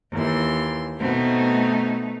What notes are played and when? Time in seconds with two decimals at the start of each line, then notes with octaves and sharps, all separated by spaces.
0.13 D#2 E3 C6
1.00 B2 A3 B3 C4 D#4